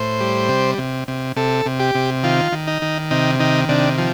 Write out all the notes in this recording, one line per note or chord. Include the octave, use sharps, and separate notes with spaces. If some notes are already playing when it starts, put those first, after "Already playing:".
Already playing: A2 C5
G3
C3
C3
C3
C3 A4
C3
G4
C3
D#3 F4
D#3
D#4
D#3
C3 D#4
D#3 D#4
C3 D4
F3